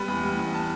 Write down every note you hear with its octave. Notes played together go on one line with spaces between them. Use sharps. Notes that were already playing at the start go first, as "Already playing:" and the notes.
Already playing: G3 B3 B5
E2
G3
E2
A5